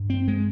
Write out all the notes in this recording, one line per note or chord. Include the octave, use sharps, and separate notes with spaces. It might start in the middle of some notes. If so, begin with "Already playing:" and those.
Already playing: G2
C4
G#3